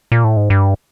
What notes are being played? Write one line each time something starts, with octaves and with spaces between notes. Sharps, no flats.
A#2
A2
G#2
G2